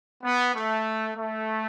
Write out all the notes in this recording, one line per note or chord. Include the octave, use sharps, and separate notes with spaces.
B3
A3
A3